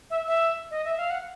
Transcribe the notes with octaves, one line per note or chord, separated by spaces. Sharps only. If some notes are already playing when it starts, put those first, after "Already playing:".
E5
E5
D#5
E5
F5
F#5